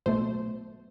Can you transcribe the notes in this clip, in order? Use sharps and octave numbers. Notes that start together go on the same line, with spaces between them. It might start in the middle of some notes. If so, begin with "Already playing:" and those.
B1 B2 A3 C5